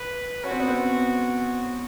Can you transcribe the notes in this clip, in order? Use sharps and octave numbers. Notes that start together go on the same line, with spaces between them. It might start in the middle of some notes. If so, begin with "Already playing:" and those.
Already playing: B4
C#4 F#4
C4
B3
C4